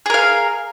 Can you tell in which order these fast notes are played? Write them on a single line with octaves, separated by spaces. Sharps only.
G#4 A#4 F5